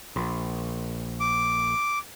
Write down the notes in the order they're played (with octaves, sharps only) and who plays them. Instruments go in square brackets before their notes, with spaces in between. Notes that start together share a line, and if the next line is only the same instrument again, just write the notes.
[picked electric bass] A#1
[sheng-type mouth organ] D6